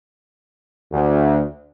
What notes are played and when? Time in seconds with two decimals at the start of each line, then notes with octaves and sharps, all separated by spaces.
0.92 D2